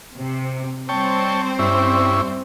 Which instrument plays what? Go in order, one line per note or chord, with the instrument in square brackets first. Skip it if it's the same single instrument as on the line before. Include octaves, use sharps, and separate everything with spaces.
[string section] C3
[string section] G3 C4 C5 [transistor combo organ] C#5 G5 A5
[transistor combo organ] G2 C#4 E4